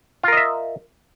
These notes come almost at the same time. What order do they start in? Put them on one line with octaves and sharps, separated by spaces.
F4 A#4 D#5 E5